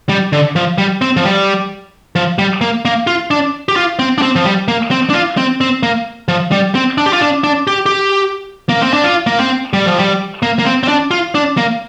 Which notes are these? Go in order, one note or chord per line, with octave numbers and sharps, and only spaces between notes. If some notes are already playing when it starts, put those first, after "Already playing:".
G3
D3
F3
G3
C4
F3
G3
F3
G3
A#3
A#3
F4
D4
G4
F4
C4
D4
C4
F3
G3
A#3
C4
D4
F4
C4
C4
A#3
F3
G3
C4
D4
G4
F4
D4
D4
G4
G4
A#3
C4
D4
F4
A#3
C4
G3
F3
G3
A#3
A#3
C4
C4
D4
F4
D4
A#3